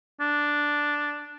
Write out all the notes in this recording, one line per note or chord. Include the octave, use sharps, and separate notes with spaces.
D4